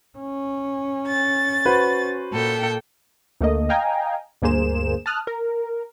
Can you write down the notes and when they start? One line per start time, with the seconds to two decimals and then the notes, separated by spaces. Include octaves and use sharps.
0.19 C#4
1.08 A6
1.65 F#4 B4 C5
2.33 A#2 A4 G5
3.41 D2 A3 A#3 D#5
3.69 D#5 F5 G5 G#5 A#5
4.42 D2 G2 A#3 G#4 C5 E7
5.06 A5 D#6 F6 F#6
5.27 A#4